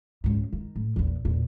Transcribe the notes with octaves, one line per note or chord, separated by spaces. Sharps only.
C#2 G#2
D#3
A2
A#1 E2
E2 A#2